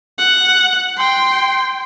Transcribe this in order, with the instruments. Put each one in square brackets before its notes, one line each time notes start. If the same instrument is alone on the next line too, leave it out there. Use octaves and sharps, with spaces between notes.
[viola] F#5
G5 C6